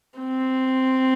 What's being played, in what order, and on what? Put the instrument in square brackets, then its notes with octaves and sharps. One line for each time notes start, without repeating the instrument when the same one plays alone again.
[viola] C4